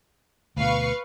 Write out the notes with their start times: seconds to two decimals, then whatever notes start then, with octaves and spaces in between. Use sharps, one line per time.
0.57 D2 B2 B4 F5 C#6